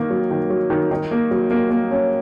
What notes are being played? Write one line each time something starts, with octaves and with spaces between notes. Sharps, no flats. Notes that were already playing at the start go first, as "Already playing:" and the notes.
Already playing: D#3 A#3
F#3
D#3
F#3
D#3
D#3
A#3
F#3
A#3
A#3
C#4